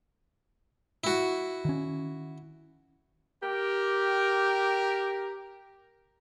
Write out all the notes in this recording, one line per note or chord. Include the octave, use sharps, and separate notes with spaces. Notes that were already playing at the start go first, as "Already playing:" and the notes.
E4 F#4
D#3 C#4
G4 A#4